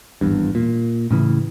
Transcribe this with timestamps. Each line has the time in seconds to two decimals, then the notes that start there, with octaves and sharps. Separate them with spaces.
0.21 G#1 E2 G2
0.55 A#2
1.11 A2 C#3 E3